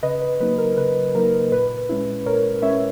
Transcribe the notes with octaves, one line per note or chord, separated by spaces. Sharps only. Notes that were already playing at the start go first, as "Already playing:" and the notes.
C#3 B4 D#5
B4
F#3 A#3 D#4 B4
A#4
C#3 B4
F#3 A#3 D#4 A#4
A#2 B4
G#3 C#4 E4
A#2 A#4 C#5
G#3 C#4 E4 C#5 E5